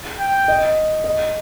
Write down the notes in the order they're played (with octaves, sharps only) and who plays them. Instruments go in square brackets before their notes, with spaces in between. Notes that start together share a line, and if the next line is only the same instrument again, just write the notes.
[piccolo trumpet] G5
[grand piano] D#5
D#5